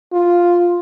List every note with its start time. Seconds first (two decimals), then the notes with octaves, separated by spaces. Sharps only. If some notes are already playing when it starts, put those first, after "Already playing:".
0.13 F4